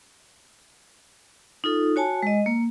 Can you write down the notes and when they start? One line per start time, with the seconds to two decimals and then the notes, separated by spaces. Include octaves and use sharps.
1.64 D#4 F4 A4
1.96 F#4 C#5 G#5 A5
2.23 G#3 D#5
2.46 A#3